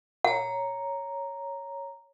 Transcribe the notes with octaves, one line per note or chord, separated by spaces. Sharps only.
C#5 F#5 A#5